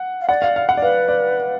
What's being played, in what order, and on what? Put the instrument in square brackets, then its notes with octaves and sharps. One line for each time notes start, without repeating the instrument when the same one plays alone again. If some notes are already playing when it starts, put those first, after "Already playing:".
Already playing: [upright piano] F#5
[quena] F5
[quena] D5 [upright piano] F#5
[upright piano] F5
F5
F#5
D5
[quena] B4 [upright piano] F5
[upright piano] D5